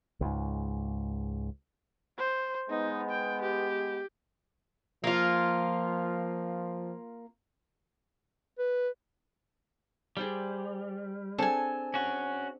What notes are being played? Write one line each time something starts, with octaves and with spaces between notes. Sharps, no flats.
C#2 G#2
C5
G#3 B3 D#4
G5
G4
F3 A#3 F4
B4
G3 G#4 C5 D5
C4 D4 G#4 A4 G#5
C#4 F#4